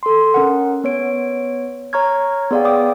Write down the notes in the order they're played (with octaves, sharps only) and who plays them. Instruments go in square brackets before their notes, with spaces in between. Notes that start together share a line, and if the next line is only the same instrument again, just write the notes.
[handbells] A4 C6
C#4 A#4 F#5
B3 C#5 D7
C#5 A#5 C#6 F6 G#6
B3 G#4 D5 F5 G5
G5 D6 D#6